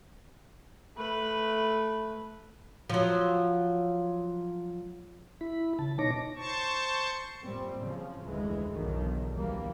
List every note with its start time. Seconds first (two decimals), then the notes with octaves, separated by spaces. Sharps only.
0.96 A3 B4
2.90 F3 F#3
5.41 E4 B5
5.79 C#3 A5
5.99 B2 D#4 C#5 D6 A#6
6.36 C5 A5 C#6
7.42 F#2 A#2 G3 C4
7.78 C#3 F3
8.23 F1 D2 E3 G#3
8.73 B1 E2 G2 D3 D#3
9.32 F1 D2 E3 G3 A#3